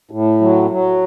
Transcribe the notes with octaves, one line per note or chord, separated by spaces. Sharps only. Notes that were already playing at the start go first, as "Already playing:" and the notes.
A2
F#3
F#3